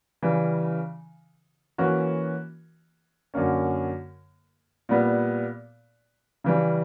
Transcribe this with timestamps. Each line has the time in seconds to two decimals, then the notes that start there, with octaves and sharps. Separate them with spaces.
0.23 C#3 E3 G3
1.78 E3 A#3 C#4 F#4
3.34 F#2 D3 A#3 C#4
4.89 A#2 G3 B3
6.44 C#3 E3 G3